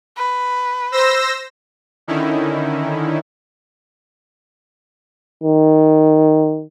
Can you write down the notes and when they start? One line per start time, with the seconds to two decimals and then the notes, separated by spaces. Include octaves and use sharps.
0.17 B4
0.92 C5 E6 A#6
2.08 D3 D#3 C#4 D#4 E4
5.43 D#3